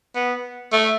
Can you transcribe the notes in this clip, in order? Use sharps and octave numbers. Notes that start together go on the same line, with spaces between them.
B3
A3